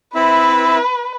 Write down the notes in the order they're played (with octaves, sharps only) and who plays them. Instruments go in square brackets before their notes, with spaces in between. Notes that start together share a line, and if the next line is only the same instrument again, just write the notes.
[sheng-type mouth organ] C4 E4 E5 [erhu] B4